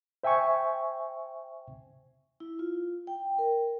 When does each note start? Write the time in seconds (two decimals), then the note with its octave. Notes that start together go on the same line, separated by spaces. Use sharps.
0.23 C5 E5 G5 G#5 C#6
2.40 E4
2.59 F4
3.07 G5
3.38 A#4